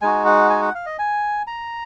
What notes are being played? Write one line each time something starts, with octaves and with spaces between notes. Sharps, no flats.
G#3 D#4 F#4 G#5
F#5
G#5
F#5
F5
D#5
G#5
A#5